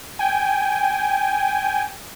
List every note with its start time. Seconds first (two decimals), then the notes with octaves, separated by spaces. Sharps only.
0.19 G5 G#5